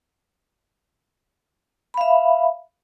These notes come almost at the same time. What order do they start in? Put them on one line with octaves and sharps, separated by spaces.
B5 F5 E5